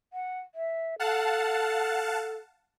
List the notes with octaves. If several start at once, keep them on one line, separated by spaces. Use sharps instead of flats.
F#5
E5
A4 F5 F#5 A5